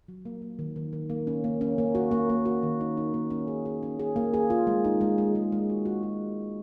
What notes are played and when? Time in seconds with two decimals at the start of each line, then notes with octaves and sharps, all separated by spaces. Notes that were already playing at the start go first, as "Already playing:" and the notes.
0.08 F#3
0.26 A#3
0.42 A#3
0.59 D#3
0.76 D#3
0.93 D#3
1.10 A#3
1.27 C#4
1.44 A#3
1.61 C#4
1.78 A#3
1.95 F#4
2.11 A#3
2.30 A#3
2.45 F#4
2.63 D#3
2.80 D#4
2.97 D#4
3.14 A#3
3.30 C#4
3.47 G#4
3.66 G#4
3.83 C#4
3.99 G#4
4.16 A#3
4.34 G#4
4.50 F4
4.67 G#3
4.85 D#4
5.01 G#3
5.18 G#3
5.35 G#3
5.52 G#3
5.69 F#4
5.85 F#4
6.03 F#4